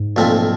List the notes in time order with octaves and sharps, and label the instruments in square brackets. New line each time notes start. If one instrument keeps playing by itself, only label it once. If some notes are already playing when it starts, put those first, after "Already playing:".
Already playing: [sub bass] G#2
[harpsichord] B1 A#2 F3 A3 C4